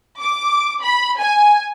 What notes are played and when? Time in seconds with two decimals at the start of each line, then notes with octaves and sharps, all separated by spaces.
0.19 D6
0.81 B5
1.19 G#5